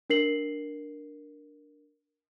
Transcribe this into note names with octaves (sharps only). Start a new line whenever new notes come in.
D4 A#4 C7 F#7